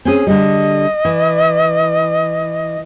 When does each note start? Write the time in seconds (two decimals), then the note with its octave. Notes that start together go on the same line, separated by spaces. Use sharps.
0.05 C4 C#4 G#4 G#5
0.27 D3 G3 D#5
1.05 E3